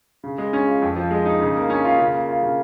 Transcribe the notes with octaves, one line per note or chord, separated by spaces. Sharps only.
C#3
G#3
C#4
F4
F2
F3
G#3
D#4
C#3
A#3
C#4
F4
C#3
A#3
F4
C#3